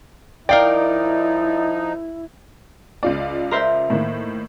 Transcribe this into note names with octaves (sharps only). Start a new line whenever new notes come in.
F3 D#4 E4 A#4 D5 F5 G5
C#2 F4 D5
A#4 C5 E5
A2 D#3 A#3